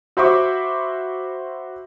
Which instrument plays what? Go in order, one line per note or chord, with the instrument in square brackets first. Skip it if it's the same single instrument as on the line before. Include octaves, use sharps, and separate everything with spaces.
[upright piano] F#4 C5 E5 B5 C#6 D6